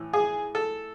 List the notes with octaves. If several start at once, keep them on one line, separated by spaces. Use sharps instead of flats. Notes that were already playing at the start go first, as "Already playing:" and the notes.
Already playing: A2 E3
G#4
A4